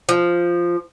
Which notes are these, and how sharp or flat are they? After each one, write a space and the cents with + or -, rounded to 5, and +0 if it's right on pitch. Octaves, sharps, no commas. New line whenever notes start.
F3 -5